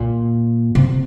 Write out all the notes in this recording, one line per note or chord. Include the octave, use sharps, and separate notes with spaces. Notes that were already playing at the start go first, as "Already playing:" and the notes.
Already playing: A#2
C3